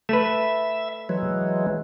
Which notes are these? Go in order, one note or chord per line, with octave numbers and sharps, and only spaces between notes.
A3 B4 E5
E3 F#3 G#3